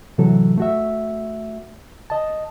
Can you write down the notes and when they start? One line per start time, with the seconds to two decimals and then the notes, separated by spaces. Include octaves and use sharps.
0.18 A2 C3 E3 F#3 A4
0.58 A3 F#4 E5
2.10 D#5 A5